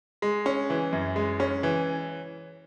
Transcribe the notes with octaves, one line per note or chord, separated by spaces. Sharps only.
G#3
C#4
E3
F#2
G#3
C#4
E3